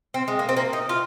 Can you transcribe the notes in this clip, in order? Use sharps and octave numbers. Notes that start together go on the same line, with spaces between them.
C4
G#3
A#3
C4
A#3
D#4
F4